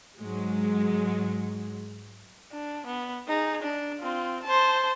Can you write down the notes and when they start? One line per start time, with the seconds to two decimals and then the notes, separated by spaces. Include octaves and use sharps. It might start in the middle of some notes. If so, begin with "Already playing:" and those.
0.19 G#2 F#3 G#3
2.52 D4
2.87 B3
3.28 D#4 G#4
3.62 D4
4.01 C4 F4
4.43 C5 A5